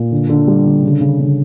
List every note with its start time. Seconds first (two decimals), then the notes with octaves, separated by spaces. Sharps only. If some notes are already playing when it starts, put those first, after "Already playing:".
Already playing: A#2
0.11 D3
0.29 D3
0.47 G3
0.66 D3
0.83 C#3
1.01 C#3
1.20 C#3